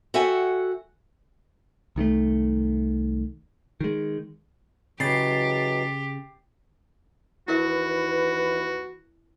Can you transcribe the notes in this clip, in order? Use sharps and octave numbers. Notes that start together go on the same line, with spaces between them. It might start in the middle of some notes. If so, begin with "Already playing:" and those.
F#4 A4 E5 G5 G#5
C2 D#3 G#3 A3
D#3 G#3
C#3 E3 F#3 G#3 G4 A6 C7
D#2 E3 E4 F#4 A#4 B4 E5